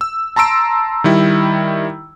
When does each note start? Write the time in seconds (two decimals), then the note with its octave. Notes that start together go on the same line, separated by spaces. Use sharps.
0.01 E6
0.36 A5 A#5 C6 E6 D7
1.04 D#3 G3 E4